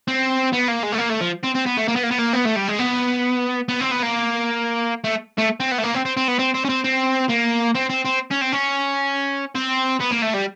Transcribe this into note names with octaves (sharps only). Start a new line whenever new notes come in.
C4
B3
A#3
G#3
A3
A#3
A3
F3
C4
C4
B3
A3
A#3
B3
A#3
B3
A#3
B3
A3
G3
G#3
B3
B3
C4
B3
A#3
A3
A3
C4
B3
A3
A#3
C4
C4
C4
B3
C4
C4
C#4
C4
C4
A#3
C4
C4
C4
C#4
C4
C#4
C4
B3
A#3
A3
G3